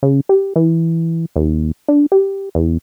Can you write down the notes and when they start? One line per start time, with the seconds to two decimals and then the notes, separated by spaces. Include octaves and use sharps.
0.03 C#3
0.29 G4
0.56 E3
1.36 D#2
1.88 D4
2.12 G4
2.55 E2